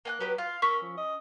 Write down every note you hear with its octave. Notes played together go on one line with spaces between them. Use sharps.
A#3 G#5 F#6
F#3 B3 G4 B4
F4 F5
C#4 A#4 C#6 E6 B6
F3
D#5